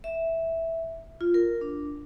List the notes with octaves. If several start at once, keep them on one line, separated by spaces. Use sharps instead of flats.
E5
F4
A#4
D4